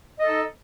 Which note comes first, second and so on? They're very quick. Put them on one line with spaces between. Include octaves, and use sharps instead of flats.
D#5 A4 D#4